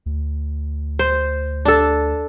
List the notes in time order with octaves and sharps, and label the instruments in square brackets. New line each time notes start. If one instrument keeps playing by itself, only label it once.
[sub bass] D2
[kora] C5
D4 A4